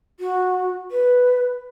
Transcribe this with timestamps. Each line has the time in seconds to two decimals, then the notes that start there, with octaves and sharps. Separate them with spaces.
0.20 F#4
0.91 B4